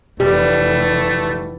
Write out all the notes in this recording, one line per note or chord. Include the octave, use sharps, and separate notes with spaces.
F1 E3 G3 A3 G4